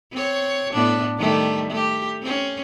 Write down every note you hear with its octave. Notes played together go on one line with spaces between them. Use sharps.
C4 C#5
A2 B3 D4
D#3 G3 A3
A3 G4
C4 C#4